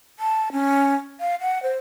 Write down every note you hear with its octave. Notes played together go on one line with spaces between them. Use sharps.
A5
C#4
F5
F#5
C5